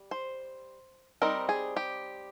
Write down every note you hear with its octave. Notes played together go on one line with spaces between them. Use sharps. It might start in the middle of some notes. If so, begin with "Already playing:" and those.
Already playing: G3
C5
G3 C4 D#4 A#4
G#4
G4